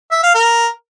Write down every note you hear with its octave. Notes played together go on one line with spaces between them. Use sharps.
E5
F5
A#4